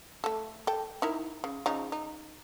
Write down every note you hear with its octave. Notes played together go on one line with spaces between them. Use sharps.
A3 A4
A4 G5
D#4 E4 A#4
C#3
C#3 F3 D#4
D#4